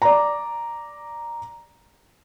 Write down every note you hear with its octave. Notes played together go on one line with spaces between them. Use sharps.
D5 A#5